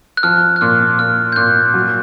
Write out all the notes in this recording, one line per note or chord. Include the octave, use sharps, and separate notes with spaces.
F#6
F3 F6
F#6
A#2 F6
A#2 F6
G6
A#2 F#6
F#3